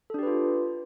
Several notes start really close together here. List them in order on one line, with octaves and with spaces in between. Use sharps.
A4 D4 G4 B4 F4